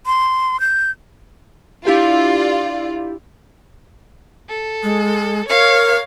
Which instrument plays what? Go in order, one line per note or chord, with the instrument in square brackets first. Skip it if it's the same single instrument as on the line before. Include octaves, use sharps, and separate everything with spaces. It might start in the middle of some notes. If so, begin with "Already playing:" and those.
[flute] C6
G6
[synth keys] D4 E4 G4 [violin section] F4 D5
[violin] A4
[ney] G#3
[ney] A#4 [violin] C#5 F5